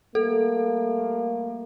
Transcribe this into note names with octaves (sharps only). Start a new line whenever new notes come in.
G3 A3 A#3 A4